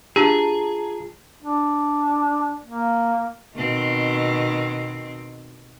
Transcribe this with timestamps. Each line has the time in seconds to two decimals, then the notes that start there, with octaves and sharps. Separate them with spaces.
0.16 D4 F4 G4 G#4 A5 A#5
1.43 D4
2.65 A#3
3.56 B2 D#3 C4